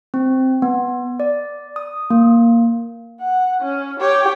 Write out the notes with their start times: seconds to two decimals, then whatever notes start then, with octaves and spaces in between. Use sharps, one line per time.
0.14 C4
0.62 B3
1.20 D5
1.76 D#6
2.10 A#3
3.21 F#5
3.61 C#4
4.00 G4 C#5